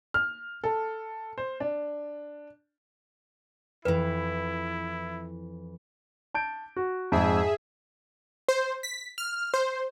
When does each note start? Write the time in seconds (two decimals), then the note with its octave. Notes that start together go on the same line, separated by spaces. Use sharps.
0.14 F6
0.64 A4
1.38 C5
1.60 D4
3.85 F2 E3 E4 B4
6.34 A5 G6 D7
6.76 F#4
7.12 F2 G#2 G#4 E5
8.49 C5
8.83 B6
9.18 F6
9.54 C5